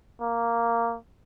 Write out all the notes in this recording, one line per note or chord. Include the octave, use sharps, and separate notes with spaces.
A#3